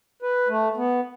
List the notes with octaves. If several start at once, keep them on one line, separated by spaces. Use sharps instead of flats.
B4
A3
B3